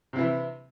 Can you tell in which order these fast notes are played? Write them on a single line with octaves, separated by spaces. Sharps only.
C3 E4 E3